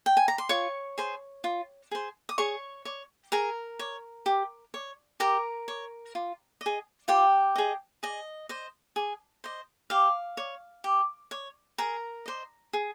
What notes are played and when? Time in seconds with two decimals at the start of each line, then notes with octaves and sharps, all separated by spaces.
0.06 G5
0.17 G#5
0.28 A#5
0.38 C6
0.49 F4 C#5 C#6
0.98 G#4 C5
1.44 F4
1.91 G#4 C5
2.29 D#6
2.38 G#4 C#5 C#6
2.85 C#5
3.32 G#4 A#4 A#5
3.79 C#5
4.26 G4
4.74 C#5
5.20 G4 A#4 A#5
5.68 C#5
6.15 F4
6.61 D#5
6.66 G#4
7.08 F4 G4 G5
7.56 G#4 D#5
8.03 G#4 D#5
8.49 C5 D#5
8.96 G#4
9.44 C5 D#5
9.90 G4 F5
10.37 C#5
10.84 G4
11.31 C#5
11.78 G#4 A#4 A#5
12.26 C5 D#5
12.73 G#4